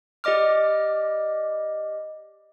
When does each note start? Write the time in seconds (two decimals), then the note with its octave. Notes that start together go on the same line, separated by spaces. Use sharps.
0.24 G4 D5 D#5 D6 F6